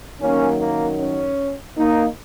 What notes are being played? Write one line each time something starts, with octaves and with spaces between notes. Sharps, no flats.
F#2 D#3 F#3 A#3 C#4
A#3
C#4
A#3 D#4